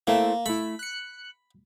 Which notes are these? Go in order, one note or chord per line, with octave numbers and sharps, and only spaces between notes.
A3 A#3 C4 E4
A3 E4 B5
F#6 C#7